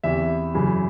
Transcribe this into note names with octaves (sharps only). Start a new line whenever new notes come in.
E2 C3 E3 E5
F#2 C#3 E3